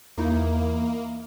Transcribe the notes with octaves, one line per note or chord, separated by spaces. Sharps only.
E2 A#3 D#4 E4 A#4